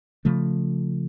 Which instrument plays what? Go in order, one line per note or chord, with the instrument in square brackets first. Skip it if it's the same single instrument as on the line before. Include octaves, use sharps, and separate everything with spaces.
[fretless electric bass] C#3 F3 A3